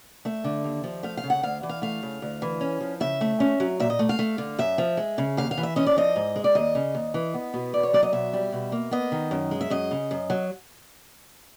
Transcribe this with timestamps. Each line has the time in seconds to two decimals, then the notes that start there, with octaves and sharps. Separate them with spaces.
0.25 A3 E5
0.44 D3
0.64 D#2
0.84 F3
1.03 A3 F5
1.17 F5
1.24 C#3
1.30 F#5
1.43 D2 F5
1.63 E3
1.69 F5
1.82 A3 F5
2.03 C#3
2.22 D2
2.42 E3
2.61 C#4
2.81 F3
3.00 C#3 E5
3.21 A3
3.40 C#4
3.60 F#3
3.80 A#2 E5
3.90 D#5
3.99 A3
4.09 F5
4.19 A3
4.38 D3
4.59 F#2 E5
4.78 F3
4.97 G#3
5.18 C#3
5.37 D#2 F5
5.51 F5
5.58 E3
5.63 E5
5.76 C#4 D#5
5.87 D5
5.96 F3 D#5
6.16 G#2
6.36 G#3
6.44 D5
6.55 D#2 D#5
6.75 C#3
6.95 D#2
7.14 E3
7.34 B3
7.54 B2
7.73 E2 D5
7.83 C#5
7.93 F#3 D5
8.03 D#5
8.12 B2 E5
8.33 G3
8.52 B2
8.72 A#3
8.91 B3 D#5
9.12 D#3
9.31 F#2
9.51 G#3
9.61 E5
9.70 F#2 D#5
9.91 C#3
10.11 F#2
10.30 F#3